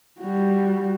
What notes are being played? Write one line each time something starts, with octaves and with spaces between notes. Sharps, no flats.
G3 F#4